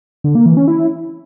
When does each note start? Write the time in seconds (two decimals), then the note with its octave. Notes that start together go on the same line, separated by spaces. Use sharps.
0.24 D3
0.35 A#3
0.46 E3
0.57 C#4
0.68 E4